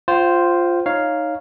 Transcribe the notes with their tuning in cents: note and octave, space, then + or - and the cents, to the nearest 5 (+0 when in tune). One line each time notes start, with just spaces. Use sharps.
F4 +0 C5 +0 G5 -40
D#4 +0 C#5 +0 F5 +0